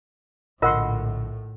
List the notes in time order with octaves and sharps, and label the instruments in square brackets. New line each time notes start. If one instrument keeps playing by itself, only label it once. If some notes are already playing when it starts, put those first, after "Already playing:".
[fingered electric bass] A#1 D3 [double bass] A2 [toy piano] F4 A#4 [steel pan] D#5 F#5 C6